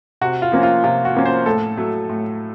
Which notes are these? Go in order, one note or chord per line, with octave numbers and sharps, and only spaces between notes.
C3 F#4
F4
F3 A#3 C#4
F4
C3 F4
F#4
F3 A#3 C#4
C5
A2 A4
F#3 A3
A2